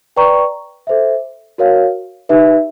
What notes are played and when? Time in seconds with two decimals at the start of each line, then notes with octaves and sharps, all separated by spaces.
0.16 B4 D5 G5 A#5 C#6
0.87 A4 C5 E5
1.58 F#4 A#4 C#5 F5
2.29 D#4 G4 B4 E5